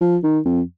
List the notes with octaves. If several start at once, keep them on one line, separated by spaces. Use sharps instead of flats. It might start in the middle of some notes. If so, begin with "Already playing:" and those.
F3
D#3
F2